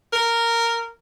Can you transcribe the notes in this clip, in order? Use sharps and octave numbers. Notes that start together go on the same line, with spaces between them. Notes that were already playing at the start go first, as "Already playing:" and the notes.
A#4